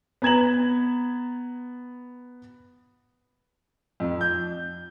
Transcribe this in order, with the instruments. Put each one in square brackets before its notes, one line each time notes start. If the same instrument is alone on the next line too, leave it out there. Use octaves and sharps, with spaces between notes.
[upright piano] B3 A#5 G#6 E7 F#7
[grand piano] F2
G6